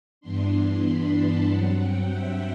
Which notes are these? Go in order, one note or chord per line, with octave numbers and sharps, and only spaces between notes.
G2 E3 B3 D4 C6
B5
A5
G2 F#3 C4 F#5
G5
E5